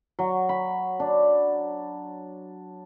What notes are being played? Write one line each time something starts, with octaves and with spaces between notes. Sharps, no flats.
F#3
B5
D4